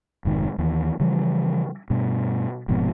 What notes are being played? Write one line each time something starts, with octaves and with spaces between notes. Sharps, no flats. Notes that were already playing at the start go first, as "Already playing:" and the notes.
F1 G#2 D#3
D#2 E3
C#3 E3 F3 G3
G2 B2
F1 F2 G#2 B2